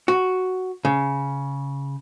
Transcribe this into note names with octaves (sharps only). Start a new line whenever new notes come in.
F#4
C#3